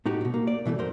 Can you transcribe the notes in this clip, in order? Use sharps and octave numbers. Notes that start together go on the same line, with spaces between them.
A2 D#4 F#4 G4
G#2 B2
A#3
D5
B2 E3 G#3 A3
F#2 A#4 C5